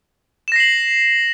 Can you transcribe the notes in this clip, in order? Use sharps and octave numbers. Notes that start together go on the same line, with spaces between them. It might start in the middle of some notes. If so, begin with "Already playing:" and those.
A#6 C7 E7 F#7